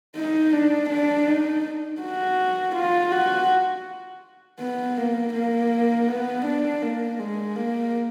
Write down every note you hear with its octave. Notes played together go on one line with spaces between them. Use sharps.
D#4
D4
D4
D#4
F#4
F4
F#4
B3
A#3
A#3
B3
D4
A#3
G#3
A#3